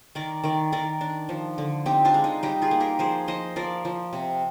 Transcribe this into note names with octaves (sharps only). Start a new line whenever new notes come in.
D#3 A#4 D5
D#3 A#4 D5
D#3 A#4 D5
D4
F3
D3
C4 D#4 G4
D4 F4
G#3
D#4
G3 D#4 G4
F4 G#4
A#3
G4 A#4
F3 G#4 C5
F3 C5 D#5
F3 A#4 D5
F3
C3